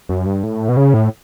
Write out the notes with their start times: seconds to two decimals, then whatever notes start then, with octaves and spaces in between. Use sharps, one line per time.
0.09 F#2
0.26 G2
0.43 A2
0.69 B2
0.77 C#3
0.94 A2